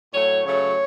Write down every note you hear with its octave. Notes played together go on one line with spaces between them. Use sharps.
A2 F#3 A3 C#5
C#3 F#3 A3 C#5